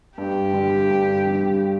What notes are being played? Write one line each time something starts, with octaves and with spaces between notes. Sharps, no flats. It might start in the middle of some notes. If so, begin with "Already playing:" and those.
G2 G4
D3 G3
G2
D3 G3